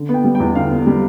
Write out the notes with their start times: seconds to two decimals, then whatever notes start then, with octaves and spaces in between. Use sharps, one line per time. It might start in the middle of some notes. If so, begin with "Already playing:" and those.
Already playing: D3
0.09 B3
0.14 G5
0.24 G3
0.35 G5
0.40 E2
0.55 D3 F5
0.71 B3
0.87 G3